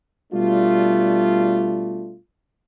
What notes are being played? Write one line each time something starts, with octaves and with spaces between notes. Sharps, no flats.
B2 G3 A3 D4 F4